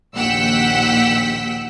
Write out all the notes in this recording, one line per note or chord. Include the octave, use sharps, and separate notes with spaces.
A#1 D#2 F#5 G5 E6 B6